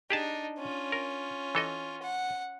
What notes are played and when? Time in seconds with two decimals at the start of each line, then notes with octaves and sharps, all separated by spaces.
0.10 D4 D#4 G4 G#4 A5
0.58 C#4 F4
0.92 A#4
1.55 E3 A4 D#5
2.02 F#5